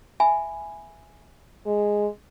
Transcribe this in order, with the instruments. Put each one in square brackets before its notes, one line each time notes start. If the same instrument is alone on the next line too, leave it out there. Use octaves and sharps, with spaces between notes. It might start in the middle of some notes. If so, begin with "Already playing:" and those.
[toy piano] E5 G#5 B5
[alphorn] G#3